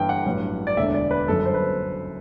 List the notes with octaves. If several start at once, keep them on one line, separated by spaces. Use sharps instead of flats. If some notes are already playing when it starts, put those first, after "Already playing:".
Already playing: G1 G2 E3 G5
F#5
A1 G2 F#3
D5
E1 D2 D3 E5
D5
B4
G1 F#2 F#3 A4
C5
B4